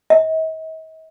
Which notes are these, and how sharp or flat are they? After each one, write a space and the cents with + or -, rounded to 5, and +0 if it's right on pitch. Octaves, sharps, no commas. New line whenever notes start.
D#5 +45